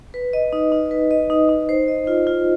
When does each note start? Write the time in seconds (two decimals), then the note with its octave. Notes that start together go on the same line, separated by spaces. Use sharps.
0.14 B4
0.33 D#5
0.53 D#4
0.72 D#4
0.91 B4
1.11 D#5
1.30 D#4
1.49 D#4
1.69 C5
1.88 D#5
2.07 F4
2.27 F4